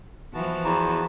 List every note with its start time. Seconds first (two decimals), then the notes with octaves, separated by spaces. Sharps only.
0.34 E3 F3 B3 F#4 A5
0.65 E2 A#5